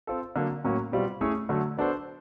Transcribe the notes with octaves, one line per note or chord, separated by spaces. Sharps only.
C4 F4 A4
D3 F#3 A#3
A2 F#3 A#3 C#4
B2 G3 C4 F4
A3 C#4 E4 G#4 C#5
D3 F#3 A3
B3 D4 F#4 A4 C5